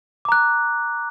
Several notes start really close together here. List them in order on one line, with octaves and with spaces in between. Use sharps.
D6 A#5 F#6